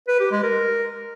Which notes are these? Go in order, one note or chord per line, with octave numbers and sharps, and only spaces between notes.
B4
G4
G#3
A#4